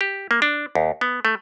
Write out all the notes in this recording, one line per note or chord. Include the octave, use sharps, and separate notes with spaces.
G4
A#3
D4
D#2
B3
A3